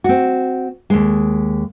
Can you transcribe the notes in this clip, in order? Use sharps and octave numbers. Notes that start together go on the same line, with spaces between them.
C4 F#4
D#2 G#3